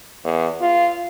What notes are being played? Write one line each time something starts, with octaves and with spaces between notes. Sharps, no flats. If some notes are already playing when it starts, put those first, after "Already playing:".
E2
F4